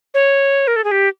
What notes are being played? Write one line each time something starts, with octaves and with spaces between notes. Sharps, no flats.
C#5
A#4
A4
G#4
G4